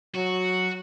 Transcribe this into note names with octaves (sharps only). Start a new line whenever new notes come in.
F#3 F#4